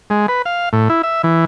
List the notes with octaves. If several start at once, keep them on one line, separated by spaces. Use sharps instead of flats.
G#3
B4
F5
A2
E4
E5
E3